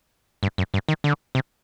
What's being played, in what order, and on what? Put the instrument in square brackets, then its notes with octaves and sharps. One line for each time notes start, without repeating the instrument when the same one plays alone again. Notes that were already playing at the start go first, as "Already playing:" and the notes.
[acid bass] G2
F#2
G2
D#3
D3
C3